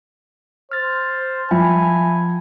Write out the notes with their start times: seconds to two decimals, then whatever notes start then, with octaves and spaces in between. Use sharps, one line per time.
0.72 C5 F6 A6
1.51 F3 E5 G5 G#5 B5